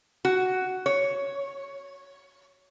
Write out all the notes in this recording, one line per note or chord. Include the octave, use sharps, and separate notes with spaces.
F#4
C#5